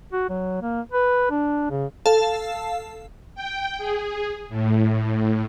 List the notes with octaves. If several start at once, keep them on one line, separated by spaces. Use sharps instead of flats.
F#4
F#3
A#3
B4
D4
C#3
A4 F5 A5
G5
G#4
A2